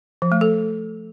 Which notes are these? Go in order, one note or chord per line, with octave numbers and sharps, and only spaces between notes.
F3
A3
A4